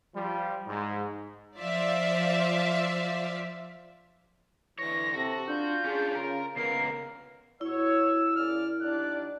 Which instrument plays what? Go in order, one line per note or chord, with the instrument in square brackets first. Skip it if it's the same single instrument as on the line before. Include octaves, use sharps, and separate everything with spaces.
[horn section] F3 G3
G#2
[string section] F3 C5 D5 E5 F5
[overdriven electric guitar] D2 C#5 [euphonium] E3 [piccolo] A#6
[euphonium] C3 [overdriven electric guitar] F#4 [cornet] A4
[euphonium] D4 [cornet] F4 [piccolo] G6
[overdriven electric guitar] C#4 D4 [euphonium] G#4
[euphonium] C#3 [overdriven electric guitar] A#4
[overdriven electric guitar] C#2 A#3 [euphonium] B3 [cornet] A#4 [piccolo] C7
[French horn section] B2 F#4 C#5 [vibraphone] E4 [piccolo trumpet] E6
[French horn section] C#3 A#3 D5 [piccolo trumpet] F6
[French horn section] D#2 D4 D5 [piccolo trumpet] F#6